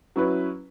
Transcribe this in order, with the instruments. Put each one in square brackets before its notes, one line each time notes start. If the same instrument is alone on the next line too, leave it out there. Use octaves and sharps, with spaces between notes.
[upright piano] F#3 C#4 E4 B4